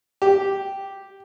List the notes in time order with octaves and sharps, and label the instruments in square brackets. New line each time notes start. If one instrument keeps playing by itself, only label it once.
[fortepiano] G4